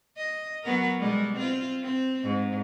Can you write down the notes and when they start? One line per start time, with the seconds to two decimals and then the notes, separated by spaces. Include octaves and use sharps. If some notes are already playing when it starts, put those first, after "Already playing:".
0.17 D#5
0.63 F#3 B3 A#4
0.99 B2 G3 G#3
1.35 C4 F4
1.82 C4
2.23 G#2